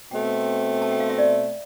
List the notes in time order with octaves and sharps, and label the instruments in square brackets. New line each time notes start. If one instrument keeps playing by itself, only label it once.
[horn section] B2 A3 C4 [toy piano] G5
[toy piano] A5
G5
F5
E5
D5